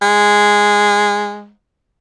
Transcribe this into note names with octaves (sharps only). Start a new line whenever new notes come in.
G#3